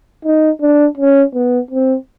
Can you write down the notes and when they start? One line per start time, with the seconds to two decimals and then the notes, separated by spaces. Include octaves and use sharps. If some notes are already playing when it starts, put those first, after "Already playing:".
0.25 D#4
0.61 D4
0.97 C#4
1.34 B3
1.71 C4